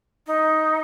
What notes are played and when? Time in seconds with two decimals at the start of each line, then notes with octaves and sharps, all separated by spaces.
0.27 D#4